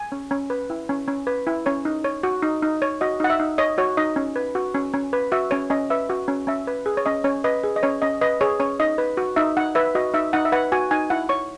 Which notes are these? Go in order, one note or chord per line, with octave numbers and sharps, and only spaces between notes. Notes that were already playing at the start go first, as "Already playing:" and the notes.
Already playing: G#5
C#4
C#4
B4
E4
C#4
C#4
B4
E4
C#4 C#5
D#4
C#5
F#4
D#4
D#4
C#5
F#4 D#5
D#4 F#5
E5
D#4
C#5 D#5
F#4 C#5
D#4 D#5
C#4
B4
F#4
C#4
C#4
B4
F#4 E5
C#4 C#5
C#4 D#5
B4 E5
F#4
C#4
C#4 E5
B4
G#4
C#5
C#4 D#5
C#4 C#5
B4 D#5
G#4
D#5
C#4 C#5
C#4 D#5
B4 D#5
G#4 C#5
C#4 C#5
D#4 D#5
B4
F#4
D#4 E5
D#4 F#5
B4 E5
F#4 D#5
D#4 E5
D#4 F#5
E5
B4 F#5
F#4 G#5
D#4 G#5
E4 F#5
C#5 C#6